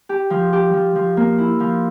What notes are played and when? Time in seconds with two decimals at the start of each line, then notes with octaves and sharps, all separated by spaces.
0.09 G4
0.30 F3
0.53 G4
0.73 F3
0.95 F3
1.17 A#3
1.38 E4
1.60 F3